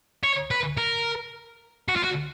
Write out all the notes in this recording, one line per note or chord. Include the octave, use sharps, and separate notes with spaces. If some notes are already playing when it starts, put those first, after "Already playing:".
C#5
B4
A#4
F#4
F4
F#4